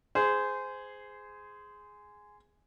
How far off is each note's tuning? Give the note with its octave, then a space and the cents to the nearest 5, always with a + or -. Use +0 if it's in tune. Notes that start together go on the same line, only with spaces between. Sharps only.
G#4 +0 C5 -20